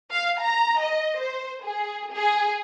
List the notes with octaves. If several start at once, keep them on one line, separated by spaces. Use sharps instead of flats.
F5
A#5
D#5
C5
G#4
G#4